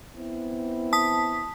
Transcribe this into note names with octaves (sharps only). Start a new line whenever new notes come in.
B3 C4 E4
A5 D#6 B6